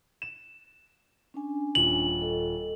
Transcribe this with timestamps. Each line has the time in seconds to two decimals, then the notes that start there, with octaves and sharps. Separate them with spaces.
0.22 E7
1.34 C#4 D4 G#5
1.75 D#1 F7 F#7
2.21 A4 D#5